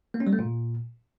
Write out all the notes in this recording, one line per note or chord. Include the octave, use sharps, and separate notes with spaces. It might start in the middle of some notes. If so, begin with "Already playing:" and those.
A#3
C#4
G3
A3
A#2